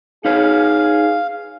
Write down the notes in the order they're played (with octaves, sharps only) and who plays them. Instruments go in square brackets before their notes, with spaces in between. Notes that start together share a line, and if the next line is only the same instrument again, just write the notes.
[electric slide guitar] D#4 B4 C#5 [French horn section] G#4 [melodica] F5